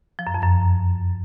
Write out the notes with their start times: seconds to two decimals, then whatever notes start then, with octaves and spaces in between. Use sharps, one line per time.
0.19 F3
0.27 F#2
0.34 F2
0.42 F#2